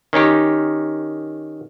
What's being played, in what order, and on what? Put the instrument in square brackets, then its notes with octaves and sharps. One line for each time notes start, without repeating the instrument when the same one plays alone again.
[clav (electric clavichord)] D#3 C#4 D#4 G4